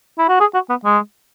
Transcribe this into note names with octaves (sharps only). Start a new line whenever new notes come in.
E4
F#4
G#4
F#4
B3
G#3